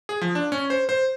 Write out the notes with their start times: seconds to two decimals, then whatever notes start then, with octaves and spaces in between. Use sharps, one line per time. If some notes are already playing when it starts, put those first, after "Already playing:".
0.09 G#4
0.21 F3
0.35 D4
0.52 C#4
0.70 C5
0.89 C5